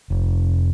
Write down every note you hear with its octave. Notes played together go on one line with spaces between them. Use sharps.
F1